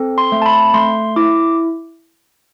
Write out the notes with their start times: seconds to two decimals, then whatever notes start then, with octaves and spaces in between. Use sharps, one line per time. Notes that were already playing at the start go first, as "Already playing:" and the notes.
Already playing: C4 A4
0.18 C6
0.32 A3
0.42 A5
0.46 B5
0.74 A3 C6
1.16 E4 D6